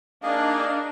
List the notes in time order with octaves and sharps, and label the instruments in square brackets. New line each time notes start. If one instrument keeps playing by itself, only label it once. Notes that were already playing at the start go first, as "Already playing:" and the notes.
[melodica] A#3 G#4 D#5 [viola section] D4 D#4 [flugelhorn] F5